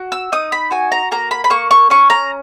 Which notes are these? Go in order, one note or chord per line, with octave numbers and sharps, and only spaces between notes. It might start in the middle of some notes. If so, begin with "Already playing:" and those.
Already playing: F#4
E6
D#4 D#6
B5
F#4 G#5
A#5
A#3 A#5
B5
B5
A#3 C#6
C#6
C#4 C#6
A#5